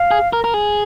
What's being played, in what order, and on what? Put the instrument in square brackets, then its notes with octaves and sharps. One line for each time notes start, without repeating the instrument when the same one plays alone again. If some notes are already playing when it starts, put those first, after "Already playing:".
Already playing: [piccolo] F5
[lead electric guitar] G#4
A#4
A#4
G#4